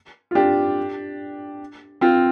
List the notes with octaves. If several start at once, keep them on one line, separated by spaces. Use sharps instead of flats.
F4
D4 G4
C4 F4